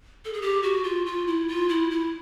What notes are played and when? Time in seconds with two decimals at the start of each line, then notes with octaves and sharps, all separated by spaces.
0.25 A4
0.33 G#4
0.42 G4
0.63 F#4
0.84 F4
1.06 F4
1.27 E4
1.48 F4
1.69 E4
1.91 E4